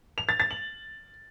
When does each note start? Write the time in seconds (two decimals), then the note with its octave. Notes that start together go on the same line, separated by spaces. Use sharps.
0.18 F7
0.29 A6
0.40 A6
0.51 F#7